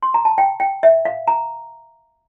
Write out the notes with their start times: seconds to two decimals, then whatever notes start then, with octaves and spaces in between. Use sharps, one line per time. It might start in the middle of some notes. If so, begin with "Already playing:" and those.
0.03 C6
0.14 A#5
0.25 A5
0.38 G5
0.60 G5
0.83 E5
1.05 F5
1.28 A#5